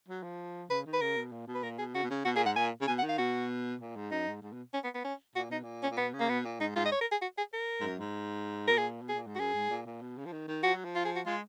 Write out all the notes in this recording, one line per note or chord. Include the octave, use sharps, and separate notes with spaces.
F#3
F3
C#3 B4
D#3
B4
C#3 A#4
B2
A#2
B2
B4
A#2 A#4
B2 G#4
C#3 F#4
B2
C#3
B2 F#4
A#2 G#4
G#2 F#5
A#2 G#5
C#3
B2 G#5
F#5
D#3
F5
B2 F#4
A#2
G#2
F#2 D#4
G#2
G#2
B2
C#4
B3
B3
C#4
A#2 F#4
B2 D#4
A#2
C#4
A#2
B2 B3
C#3
A#3
B2 B3
A#2
G#2 D#4
G#2 F4
D#5
C#5
A#4
G#4
F#4
G#4
A#4
G#2
F#2
G#2
B2 A#4
A#2 G#4
B2
G#4
A#2
G#2
F#4
F#2 G#4
G#2
A#2
A#2
B2
C#3
F3
D#3
D#3
F3 F#4
F#3
F3
F4
G#4
F#4
G#3 F4